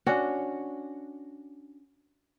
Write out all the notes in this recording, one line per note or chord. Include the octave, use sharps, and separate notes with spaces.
C#4 D4 F#4